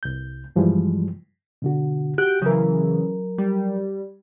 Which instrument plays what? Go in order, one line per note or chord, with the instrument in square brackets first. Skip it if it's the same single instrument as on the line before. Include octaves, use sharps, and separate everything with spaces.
[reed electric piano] C2 G6
G2 E3 F3 G3 G#3
B2 D3 F#4
[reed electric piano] F#4 G4 F#6 [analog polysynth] G5
[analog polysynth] C#3 E3 [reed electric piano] F#3 A#4
[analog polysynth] G3